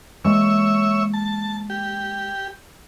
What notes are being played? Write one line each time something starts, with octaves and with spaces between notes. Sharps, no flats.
E3 G#3 A#3 C#5 E5
A5
G4